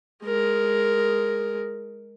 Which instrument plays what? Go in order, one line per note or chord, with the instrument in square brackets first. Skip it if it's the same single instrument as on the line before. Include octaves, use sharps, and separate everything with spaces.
[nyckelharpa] G#3 A#4